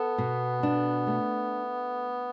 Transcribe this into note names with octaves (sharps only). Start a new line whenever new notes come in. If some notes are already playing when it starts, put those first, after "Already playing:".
Already playing: B3 A4
B2
D4
A3